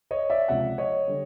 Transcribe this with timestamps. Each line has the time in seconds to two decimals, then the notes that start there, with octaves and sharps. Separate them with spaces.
0.11 C#5 D#5
0.30 D5 E5
0.48 C#2 C3 F3 E5 F#5
0.78 C#5 D#5
1.08 D3 G3